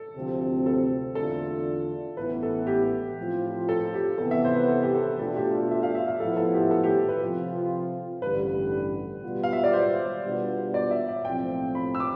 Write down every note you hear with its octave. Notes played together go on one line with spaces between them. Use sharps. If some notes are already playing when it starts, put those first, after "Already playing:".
Already playing: A4
D2 C3 F3 C4
A4
E2 D3 A3 D4 F4 A4
A1 A2 E3 B3 B4
A4
G4
A2 F3 C4 F4
A4
G4
C3 E3 B3 A4
E5
C5
B4
A4
G4
A4
B2 A3 D4 F4 A4
G4
E5
F5
E5
F5
A2 F3 B3 E4 A4
A4
G4
A4
G4
B4
C3 F3 C4 F4
A1 G2 D3 G3 B4
B2 G3 B3 F4
F5
E5
D5
C5
B2 G3 B3 D4 F4
D5
E5
E5
B1 A2 F3 C4 G5
B5
E6
D6